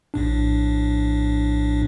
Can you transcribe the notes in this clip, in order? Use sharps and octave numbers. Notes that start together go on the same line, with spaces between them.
A#1 A2 D4